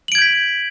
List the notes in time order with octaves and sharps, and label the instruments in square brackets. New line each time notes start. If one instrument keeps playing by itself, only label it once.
[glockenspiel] F#7
D7
G#6
G6
B6